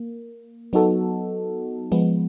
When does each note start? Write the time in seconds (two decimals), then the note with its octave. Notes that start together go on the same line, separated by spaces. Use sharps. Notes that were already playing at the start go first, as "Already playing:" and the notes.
Already playing: A#3
0.73 F#3 B3 D#4 F#4 A4
1.92 F3 G#3 B3